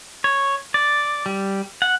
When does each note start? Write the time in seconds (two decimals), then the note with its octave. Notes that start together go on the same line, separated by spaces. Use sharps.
0.24 C#5
0.74 D5
1.26 G3
1.82 F#5